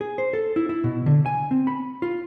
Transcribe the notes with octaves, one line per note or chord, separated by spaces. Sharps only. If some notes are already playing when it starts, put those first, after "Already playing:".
G#4
C5
A4
E4
E4
B2
D3
G#5
C4
B5
F4